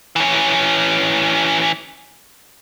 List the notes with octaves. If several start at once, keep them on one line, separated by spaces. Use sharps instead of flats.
E3 C#4